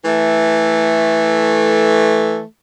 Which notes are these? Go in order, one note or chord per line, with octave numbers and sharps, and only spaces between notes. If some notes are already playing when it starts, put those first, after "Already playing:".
E3 A3